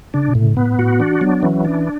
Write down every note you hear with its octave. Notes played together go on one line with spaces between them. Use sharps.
C#3 D4
B2
A2
C#3
A2 B3
A2 F#4
E3 D4
F#3 B3
E3 C#4
D4